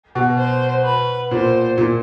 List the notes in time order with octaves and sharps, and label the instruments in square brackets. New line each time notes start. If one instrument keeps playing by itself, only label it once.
[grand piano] B2
[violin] C5
B4
[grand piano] A#2 [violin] C5
[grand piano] A#2